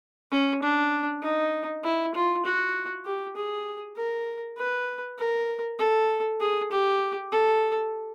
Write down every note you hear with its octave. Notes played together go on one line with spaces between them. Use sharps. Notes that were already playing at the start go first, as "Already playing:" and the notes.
C#4
D4
D#4
E4
F4
F#4
G4
G#4
A#4
B4
A#4
A4
G#4
G4
A4